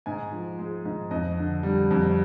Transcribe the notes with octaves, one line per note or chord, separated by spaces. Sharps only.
G#2 G#5
F3
G#3
G#2
F2 D#5
D3
G3
F2